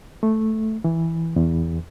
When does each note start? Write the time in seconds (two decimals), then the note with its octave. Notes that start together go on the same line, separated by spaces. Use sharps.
0.23 A3
0.84 E3
1.36 E2